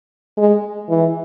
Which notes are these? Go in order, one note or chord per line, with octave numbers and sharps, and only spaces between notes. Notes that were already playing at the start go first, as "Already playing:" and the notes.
G#3
E3